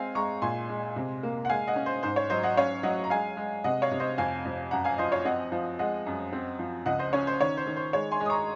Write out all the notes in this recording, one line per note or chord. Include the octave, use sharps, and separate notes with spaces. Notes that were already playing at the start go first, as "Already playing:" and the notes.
Already playing: G#3 C4 F5 G#5
G#3 A#5 C#6
A#2 G#5 C6
G#3
C3
A#3
F#5
G#3 F5 G#5
D#5 F#5
C#4
C5
G#2 C5
C#5
F#3 C5 D#5
D#5 F#5
C#4 C#5 F5
F#3 D#5 F#5
A#5
G#3 F5 G#5
G#3
C3 D#5 F#5
C#5 F5
C3
C5 D#5
F2 F5 G#5
F2
F#2 F#5 A#5
F5 G#5
F3 C5 D#5
C#5 F5
C4 D#5 F#5
F3
G#3 D#5 F#5
F#2
C4
F3
C#2 D#5 F#5
C5 D#5
C#4 C#5
C5
D#3 C#5
C5
D#3
C5
G#3 C#5
G#5 C6
G#3
D#6
A#5 C#6